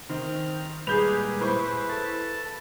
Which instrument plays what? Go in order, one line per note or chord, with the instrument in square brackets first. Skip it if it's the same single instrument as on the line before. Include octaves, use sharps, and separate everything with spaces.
[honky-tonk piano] D#3 [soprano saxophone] C4 [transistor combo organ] F6
[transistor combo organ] A#2 G3 G#3 [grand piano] G#4 G6 F7 [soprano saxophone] B4
[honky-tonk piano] E4 C5 C#6 [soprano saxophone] B4
[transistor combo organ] A4 A5